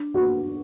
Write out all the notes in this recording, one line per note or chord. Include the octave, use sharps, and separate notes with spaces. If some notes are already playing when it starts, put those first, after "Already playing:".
Already playing: D4
F#4